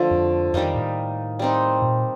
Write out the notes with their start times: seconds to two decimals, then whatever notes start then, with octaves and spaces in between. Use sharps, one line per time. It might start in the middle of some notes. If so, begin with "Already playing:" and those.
Already playing: D3 F3 A3
0.11 F2
0.54 F2 D#3 G3 A#3 D#4
0.75 A2
1.39 G3 C4 D#4
1.82 A#2